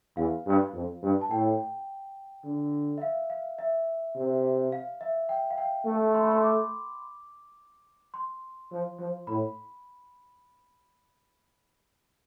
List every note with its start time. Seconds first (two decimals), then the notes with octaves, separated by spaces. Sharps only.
0.17 E2 F5
0.46 G2
0.74 F2
1.02 G2
1.21 A5
1.31 A2 G5
2.44 D3
2.98 E5
3.02 F5
3.30 F5
3.59 E5
4.16 C3
4.72 F5
5.01 E5
5.29 G5
5.51 F5
5.58 G5
5.86 A3
6.14 C6
6.23 B5
6.31 C6
6.43 D6
8.14 C6
8.71 F3
8.99 F3
9.27 A2 B5